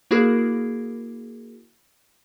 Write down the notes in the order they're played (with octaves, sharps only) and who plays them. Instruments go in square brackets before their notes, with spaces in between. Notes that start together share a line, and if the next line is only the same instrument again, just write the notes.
[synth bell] A#3 E4 F#4 G#4 A#4